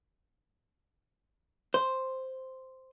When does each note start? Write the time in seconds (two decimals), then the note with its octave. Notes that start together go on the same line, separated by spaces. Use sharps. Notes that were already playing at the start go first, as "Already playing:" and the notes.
1.74 C5